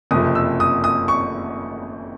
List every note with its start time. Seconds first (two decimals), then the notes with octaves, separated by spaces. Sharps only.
0.11 F#1 F2 C3 F3 D#6
0.35 E6
0.60 D#6
0.84 D#6
1.08 C#6